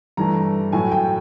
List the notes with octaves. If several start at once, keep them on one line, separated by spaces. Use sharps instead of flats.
G2 E3 A3 A#5
A2 F#3 A3 G#5
G5